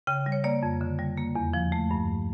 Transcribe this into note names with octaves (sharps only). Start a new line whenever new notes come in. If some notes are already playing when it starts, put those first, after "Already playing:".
C#3 G5
G3
C#5
A#3 D5
F2
D3
G3
A#3
E2
F3
A3
G2